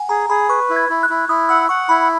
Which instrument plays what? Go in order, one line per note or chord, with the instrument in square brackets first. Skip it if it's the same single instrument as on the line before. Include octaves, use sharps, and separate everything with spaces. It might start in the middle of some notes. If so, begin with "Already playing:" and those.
Already playing: [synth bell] F#5 G#5
[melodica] G#4 [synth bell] A#5
[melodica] G#4 [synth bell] B5
[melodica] B4 [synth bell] C#6
[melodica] E4
[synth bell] G#6
[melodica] E4
[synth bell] F#6
[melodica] E4
[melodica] E4 [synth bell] D#6
[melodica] F#5 [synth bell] E6
[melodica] F#5 [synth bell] C#6
[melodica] E4 [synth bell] B5